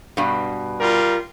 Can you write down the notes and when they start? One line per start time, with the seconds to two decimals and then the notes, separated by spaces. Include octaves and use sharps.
0.17 G2 B2
0.80 G3 F4 A#4